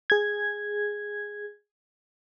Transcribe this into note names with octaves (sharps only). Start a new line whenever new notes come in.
G#4 G#6